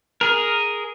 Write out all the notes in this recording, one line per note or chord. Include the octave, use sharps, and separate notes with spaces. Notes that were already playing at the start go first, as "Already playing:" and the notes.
G#4 A#4